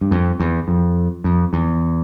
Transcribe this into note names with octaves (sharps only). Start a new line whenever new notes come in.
G2
F2
E2
F2
F2
E2